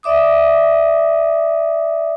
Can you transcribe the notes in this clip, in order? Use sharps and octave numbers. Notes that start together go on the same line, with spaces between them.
D5 E5 D6 D#6